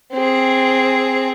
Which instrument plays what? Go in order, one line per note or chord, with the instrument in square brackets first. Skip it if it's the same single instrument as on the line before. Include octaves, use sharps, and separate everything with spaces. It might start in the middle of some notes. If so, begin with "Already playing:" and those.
[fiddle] C4 G#4